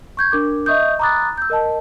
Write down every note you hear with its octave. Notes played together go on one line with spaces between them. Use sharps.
C#6 G6 G#6
D4 A#4 D6
D#5 E5 C#6 D#6 G6
A#5 B5 D6 D#6 F#6 A6
E6 G6
A#4 D#5 A5